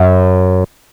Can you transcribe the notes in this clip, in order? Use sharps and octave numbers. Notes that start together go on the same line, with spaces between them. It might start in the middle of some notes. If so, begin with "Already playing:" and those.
Already playing: F#2